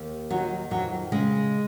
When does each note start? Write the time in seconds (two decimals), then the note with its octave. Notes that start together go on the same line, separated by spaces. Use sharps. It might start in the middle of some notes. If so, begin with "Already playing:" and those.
Already playing: D#2
0.30 D#3 F#3
0.71 F2 F#3
1.12 C#3 G#3